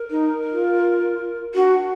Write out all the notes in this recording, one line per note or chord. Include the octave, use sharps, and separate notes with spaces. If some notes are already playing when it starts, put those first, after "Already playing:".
Already playing: A#4
D#4
F4
D4 F#4